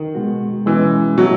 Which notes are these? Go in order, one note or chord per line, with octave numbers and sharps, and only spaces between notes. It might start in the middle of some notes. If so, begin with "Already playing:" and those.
Already playing: D#3
B2 G#3 B3 F#4
B2 E3 G#3 C#4 G#4
B2 F#3 A3 E4 A4